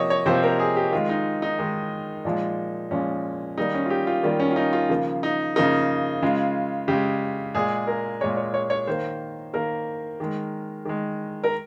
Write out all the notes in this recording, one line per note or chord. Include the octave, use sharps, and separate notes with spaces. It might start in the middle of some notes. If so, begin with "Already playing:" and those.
Already playing: C3 F3 A#3 C#5 D#5
C#5
C3 F3 A#3 C5
A#4
G#4
G4
D#3 G#3 F4
D#4
D#4
D#3 G#3
A#2 F3 G#3
A#2 F3 G#3 C#4
D#3 G3 A#3 D#4
C#4
F4
G4
F4
D#3 G3 A#3 F4
C#4
F4
D#4
F4
C#3 F3 A#3
D#4
C#3 F3 A#3 D#4
C#3 G#3 F4
C#3 G#3 G4
A#2 G#3 G#4
A#4
A#2 G#3 C#5
C#5
C#5
C#5
D#3 A#3 C5
D#3 A#3 A#4
D#3 G#3
D#3 G#3
A#4